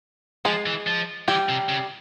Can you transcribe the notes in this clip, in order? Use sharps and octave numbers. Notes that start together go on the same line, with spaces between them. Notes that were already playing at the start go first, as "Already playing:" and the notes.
F3 G#3 G#4
E3
F3
E3 G3 G4
C3
C#3